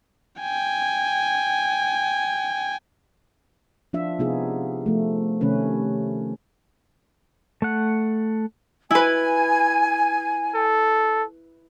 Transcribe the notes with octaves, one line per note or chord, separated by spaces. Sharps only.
G5 G#5
F3 D4 F4 E5
C3 B3 D#4 F4 G#4
F3 A3
C3 D#3 A3 C#4 B4
A3 F#5
E4 B4 G#5
A4